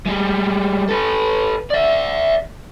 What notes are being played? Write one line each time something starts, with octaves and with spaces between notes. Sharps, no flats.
G3 G#3
A4 B4
D5 E5